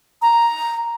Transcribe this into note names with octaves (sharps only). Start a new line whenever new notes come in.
A#5